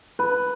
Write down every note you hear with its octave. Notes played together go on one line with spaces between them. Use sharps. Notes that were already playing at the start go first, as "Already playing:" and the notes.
B4